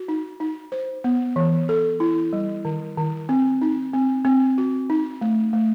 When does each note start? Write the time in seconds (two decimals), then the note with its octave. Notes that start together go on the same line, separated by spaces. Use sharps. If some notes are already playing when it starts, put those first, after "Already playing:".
Already playing: F#4
0.08 D#4
0.40 D#4
0.72 C5
1.04 B3
1.36 E3
1.69 A4
2.00 E4
2.33 G3
2.65 D#3
2.97 D#3
3.29 C4
3.62 D#4
3.94 C4
4.25 C4
4.58 F#4
4.90 D#4
5.21 A3
5.53 A3